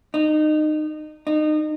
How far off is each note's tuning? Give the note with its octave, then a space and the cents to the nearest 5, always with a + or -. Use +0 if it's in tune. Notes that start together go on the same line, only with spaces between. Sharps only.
D#4 -25
D#4 -30